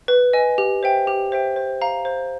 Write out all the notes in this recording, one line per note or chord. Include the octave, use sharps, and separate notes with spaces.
B4
D#5 G#5
G4
C5 E5 G5
G4
C5 E5 G5
C5
F5 A#5
C5